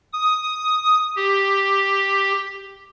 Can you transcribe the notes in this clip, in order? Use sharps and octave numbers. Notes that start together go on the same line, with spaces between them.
D#6
G4